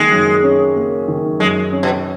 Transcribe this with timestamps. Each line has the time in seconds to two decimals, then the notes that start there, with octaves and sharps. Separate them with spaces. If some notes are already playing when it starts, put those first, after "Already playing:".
Already playing: F#2 D#3 G#3 A#3
0.11 F#2
0.43 C#4
0.76 A#3
1.08 D#3
1.40 F#2 G#3
1.72 C#4
1.83 B2